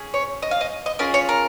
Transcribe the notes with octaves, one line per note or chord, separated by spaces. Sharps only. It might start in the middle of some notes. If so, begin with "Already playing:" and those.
Already playing: C#4 G#4
C#5
D#5
F5
D#5
D#5
C#4 F4 G#4 A#4
C#5
A#4